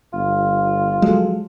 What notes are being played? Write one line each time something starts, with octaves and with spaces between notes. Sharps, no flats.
G1 F4
F3 F#3 G#3 A4